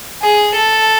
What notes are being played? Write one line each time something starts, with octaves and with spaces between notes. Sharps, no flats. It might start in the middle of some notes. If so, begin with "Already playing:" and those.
G#4
A4